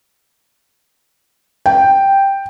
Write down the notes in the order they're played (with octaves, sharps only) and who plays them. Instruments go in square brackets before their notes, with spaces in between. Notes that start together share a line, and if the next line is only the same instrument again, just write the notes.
[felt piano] G5